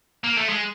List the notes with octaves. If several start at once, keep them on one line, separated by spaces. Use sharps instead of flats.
A#3
A3
G#3